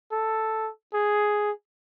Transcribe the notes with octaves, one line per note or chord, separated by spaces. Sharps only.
A4
G#4